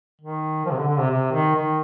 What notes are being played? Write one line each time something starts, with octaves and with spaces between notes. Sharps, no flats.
D#3
F3
C3
D3
D3
C3
C3
D#3
D#3